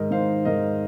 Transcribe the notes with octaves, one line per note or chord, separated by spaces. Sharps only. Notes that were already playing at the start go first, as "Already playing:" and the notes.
Already playing: G#2 D#3 A#4 D#5
G#2 D#3 C5 F5
G#2 D#3 A#4 D#5